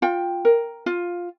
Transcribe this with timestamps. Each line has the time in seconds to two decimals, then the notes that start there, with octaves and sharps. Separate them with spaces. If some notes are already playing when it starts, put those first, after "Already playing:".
0.02 F4 G5
0.45 A#4
0.86 F4